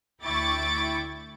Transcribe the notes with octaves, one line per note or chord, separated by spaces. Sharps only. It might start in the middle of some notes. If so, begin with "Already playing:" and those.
D2 E4 G5 C#6 D6 A6